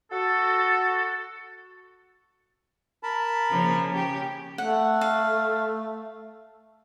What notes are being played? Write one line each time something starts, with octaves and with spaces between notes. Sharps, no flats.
F#4 A4
A#4 A5 B5
C#3 F3 A#3
C#4 G4
A3 F#5
F5